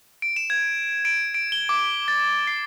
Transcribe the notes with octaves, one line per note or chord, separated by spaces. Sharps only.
D7
E7
G#6
D7
D7
G7
D6
A6
C7